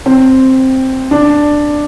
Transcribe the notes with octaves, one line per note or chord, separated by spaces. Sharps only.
C4
D4